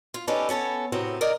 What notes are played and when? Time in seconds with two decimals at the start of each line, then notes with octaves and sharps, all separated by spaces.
0.14 F4
0.27 C#4 D#4 G4 A4 B4 D5
0.49 B3 C#4 A4 C#5
0.92 A2 C3 F#3 B3 C4
1.21 A#4 D5 D#5 A#5